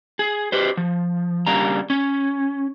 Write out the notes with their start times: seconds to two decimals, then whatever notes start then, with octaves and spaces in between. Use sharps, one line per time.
0.19 G#4
0.52 G4 B4 C5
0.77 F3
1.46 C#3 G3 A#3 D4 A#5
1.90 C#4